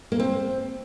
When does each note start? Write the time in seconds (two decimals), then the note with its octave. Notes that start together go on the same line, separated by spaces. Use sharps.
0.12 A#3
0.20 C4